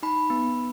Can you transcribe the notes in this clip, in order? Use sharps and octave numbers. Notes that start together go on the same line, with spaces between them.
D#4 B5
B3